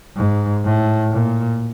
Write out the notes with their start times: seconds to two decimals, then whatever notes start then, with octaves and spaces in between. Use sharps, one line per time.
0.17 G#2
0.65 A2
1.12 A#2